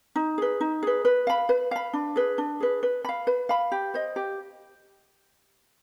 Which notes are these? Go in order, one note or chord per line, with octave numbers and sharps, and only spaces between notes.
D#4
G#4 B4
D#4
G#4 B4
B4
F5 B5
B4
F5 B5
D4
G#4 B4
D4
G#4 B4
B4
F5 B5
B4
F5 B5
G4
C5 D#5
G4